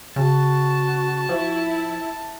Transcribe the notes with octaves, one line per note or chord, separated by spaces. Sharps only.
C#3 F#4 A5
F3 E4